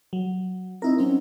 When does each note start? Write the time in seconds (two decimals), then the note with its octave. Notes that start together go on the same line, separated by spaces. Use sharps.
0.13 F#3
0.82 C4 D#4 E4 A#4
0.98 F#3 C4 C#4